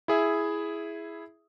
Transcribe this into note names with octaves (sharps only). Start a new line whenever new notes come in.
E4 G#4 E5